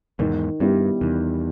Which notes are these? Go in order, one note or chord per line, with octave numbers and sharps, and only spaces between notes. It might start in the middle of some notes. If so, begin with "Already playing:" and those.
E2 G#2 D#3
G2 G3 B3 E4
E2 D#3